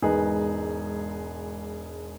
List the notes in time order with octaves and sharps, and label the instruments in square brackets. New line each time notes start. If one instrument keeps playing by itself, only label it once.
[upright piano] E1 G#2 D#4 G#4 B4 G#5